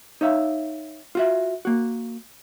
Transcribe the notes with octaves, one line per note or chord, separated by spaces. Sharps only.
D#4 C#5 E5 F5
F4 F#4 E5
A#3 F#4